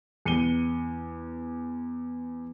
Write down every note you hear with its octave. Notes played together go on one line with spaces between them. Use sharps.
E2 C#7 D#7 G7